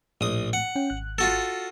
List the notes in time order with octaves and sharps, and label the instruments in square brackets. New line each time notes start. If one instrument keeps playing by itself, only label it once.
[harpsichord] A#1 D#6 [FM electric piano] A2
[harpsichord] F#5
[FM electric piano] C#4 G5
G#1 F#6
[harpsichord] F4 F#4 A4